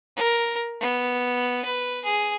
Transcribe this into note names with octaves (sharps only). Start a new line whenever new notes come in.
A#4
B3
B4
G#4